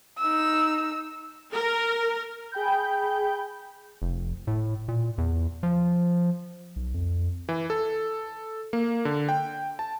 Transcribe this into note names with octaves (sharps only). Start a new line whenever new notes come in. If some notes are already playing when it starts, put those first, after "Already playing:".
D#4 E6
A#4
G#4 G5 B5 G6
F1
A2
A#2
E2
F3
B1
F2
E3
A4
A#3
D3
G5
A5